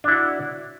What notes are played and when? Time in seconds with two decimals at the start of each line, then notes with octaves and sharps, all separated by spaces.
0.04 D4
0.08 E4
0.12 F#4